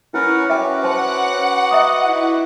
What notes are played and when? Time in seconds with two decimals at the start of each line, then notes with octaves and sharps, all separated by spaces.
0.14 C#4 E4 A#4 B4 F#5
0.50 F#4 B4 E5 G5 D6
0.83 C#4 C5 F#5 A5 C6
1.71 D#5 E5 A#5 D#6
2.07 E4